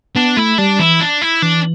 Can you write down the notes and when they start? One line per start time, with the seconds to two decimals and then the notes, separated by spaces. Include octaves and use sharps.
0.16 B3 D4
0.37 A3 E4
0.58 G3 D4
0.79 E3 E4
1.01 D4
1.21 E4
1.42 E3 D4